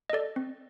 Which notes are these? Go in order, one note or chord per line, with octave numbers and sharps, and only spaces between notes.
D#5
A4 D5
C4